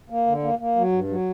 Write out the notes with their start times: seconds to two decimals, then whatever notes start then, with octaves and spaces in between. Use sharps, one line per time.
0.10 A#3
0.27 D3
0.43 A#3
0.59 A#3
0.76 F#3
0.92 G2
1.09 F#3